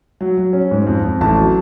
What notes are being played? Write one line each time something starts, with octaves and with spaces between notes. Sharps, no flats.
F#3
F#3
C#4
G#2
F2
F2
A1 A5
F#3